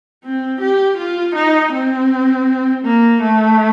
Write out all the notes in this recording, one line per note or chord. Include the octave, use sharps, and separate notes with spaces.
C4
G4
F4
D#4
C4
A#3
A3